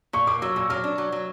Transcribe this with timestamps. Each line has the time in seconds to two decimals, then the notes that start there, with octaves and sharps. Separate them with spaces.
0.13 A#2 C#6
0.27 A#3 D6
0.42 F#3 E6
0.56 A#2 E6
0.70 F#3 F6
0.84 D4
0.98 F#3
1.12 F#3